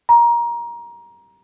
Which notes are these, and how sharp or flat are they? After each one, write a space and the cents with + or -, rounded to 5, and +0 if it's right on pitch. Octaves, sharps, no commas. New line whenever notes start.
A#5 +20